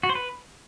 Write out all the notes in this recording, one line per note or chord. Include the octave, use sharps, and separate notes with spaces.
F#4
C5
B4